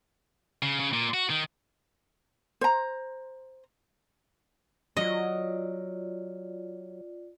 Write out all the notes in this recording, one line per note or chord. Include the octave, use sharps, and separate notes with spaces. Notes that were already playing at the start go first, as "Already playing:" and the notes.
C#3
C#3
A#2
F#4
D#3
C5 A#5
F#3 F4 D5 D#5